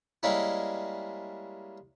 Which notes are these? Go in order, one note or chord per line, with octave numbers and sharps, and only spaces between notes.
G3 G#3 A#3 C#4 E4